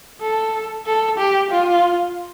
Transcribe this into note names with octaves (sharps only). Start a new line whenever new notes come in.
A4
A4
G4
F4